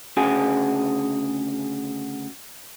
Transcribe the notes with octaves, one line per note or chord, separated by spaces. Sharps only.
D2 C#3 F#4 G#4